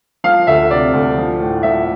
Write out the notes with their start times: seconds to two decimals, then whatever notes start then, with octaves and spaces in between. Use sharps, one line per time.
0.24 F3 F5
0.47 D2 E5
0.71 C3 D5
0.93 D2
1.18 F3
1.41 A2
1.63 F3 E5